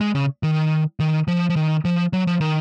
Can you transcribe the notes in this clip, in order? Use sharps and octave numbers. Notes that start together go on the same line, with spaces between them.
G#3
C#3
D#3
D#3
F3
F3
D#3
F3
F#3
F3
D#3